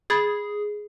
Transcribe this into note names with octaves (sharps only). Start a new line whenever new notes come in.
G#4 B5 G#6 A6